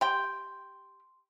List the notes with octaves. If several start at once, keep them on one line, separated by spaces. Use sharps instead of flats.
G4 G5 C6